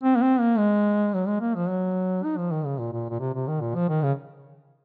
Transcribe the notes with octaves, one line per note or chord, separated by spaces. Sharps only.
C4
A#3
C4
A#3
G#3
F#3
G#3
A#3
F3
F#3
D#4
F3
D#3
C#3
A#2
A#2
A#2
C3
C3
D#3
A#2
F3
D#3
C#3